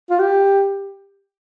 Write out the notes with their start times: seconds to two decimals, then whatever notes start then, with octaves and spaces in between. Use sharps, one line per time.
0.10 F4
0.19 G4